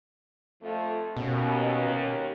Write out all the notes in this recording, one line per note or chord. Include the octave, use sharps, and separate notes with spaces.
F2 F3 A3
D#2 B2 C#4